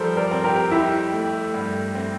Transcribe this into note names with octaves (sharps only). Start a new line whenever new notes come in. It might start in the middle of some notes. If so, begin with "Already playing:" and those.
Already playing: F3 G3 A4 A#4 C5
A#4 D5
C4
G4 A#4
F2 E4 G4
A3
G2
C4